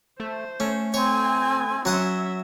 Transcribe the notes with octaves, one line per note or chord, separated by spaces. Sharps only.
A3 C5
A3 C#4
C4 C#5 G#5
F#3 C#4 E5 F#5 D#6